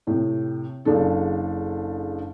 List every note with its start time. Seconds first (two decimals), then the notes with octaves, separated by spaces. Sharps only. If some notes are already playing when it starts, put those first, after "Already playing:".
0.07 A2 C3
0.85 F#1 C#3 D4 A4